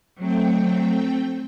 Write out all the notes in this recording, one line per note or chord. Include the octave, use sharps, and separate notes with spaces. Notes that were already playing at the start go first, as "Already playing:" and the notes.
F#3 A3 C4 G5